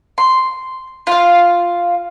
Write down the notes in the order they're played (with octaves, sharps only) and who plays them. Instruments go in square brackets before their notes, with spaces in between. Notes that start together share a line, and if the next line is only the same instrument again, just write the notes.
[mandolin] C6
F4 F5